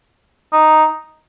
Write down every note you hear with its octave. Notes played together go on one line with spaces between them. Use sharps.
D#4